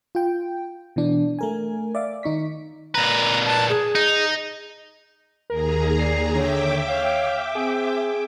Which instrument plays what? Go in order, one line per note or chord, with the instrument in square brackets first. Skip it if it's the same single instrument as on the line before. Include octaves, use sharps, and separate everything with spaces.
[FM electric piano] F4 G5
B2 E3 D4
A3 A#4 G#5
D5 E5 F5 D6
D#3 D#4 C#6 B6
[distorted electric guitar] A#2 B4 [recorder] A#5
[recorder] A5
G#4
[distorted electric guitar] D#4
[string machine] D#2 G#4 A#5 [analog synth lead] A#4
[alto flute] D5 [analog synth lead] C7
[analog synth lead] D3 [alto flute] C#5 [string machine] E5 G5 D6
[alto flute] C#5 [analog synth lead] F5
[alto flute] C4 [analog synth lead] G#4